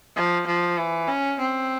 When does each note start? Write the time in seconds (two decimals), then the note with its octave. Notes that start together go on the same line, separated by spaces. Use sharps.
0.16 F3
0.47 F3
0.78 E3
1.08 C#4
1.40 C4